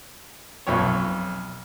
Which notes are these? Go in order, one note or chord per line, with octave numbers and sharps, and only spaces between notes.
B1 F2 C#5